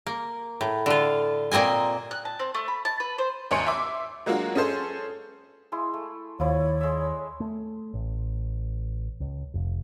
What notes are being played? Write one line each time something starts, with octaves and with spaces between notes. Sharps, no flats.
A#3
A2
D3 F4
A#2 A#3 C4 D#5 G#5
F#6
A5
C4
A3
B5
A5
B4
C5
G#1 D#2 C#5 G#5 C6 C#7
E5 C6 D6
F#3 G#3 A#3 D4 F4 F#4
C#4 G#4 A4 C5
G#3 E4 C6
A3
D#2 F3 E4 C#5 D5
G#3 E5
A3
A1
C#2
F1